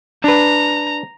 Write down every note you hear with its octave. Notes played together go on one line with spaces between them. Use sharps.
D4 B4 A#5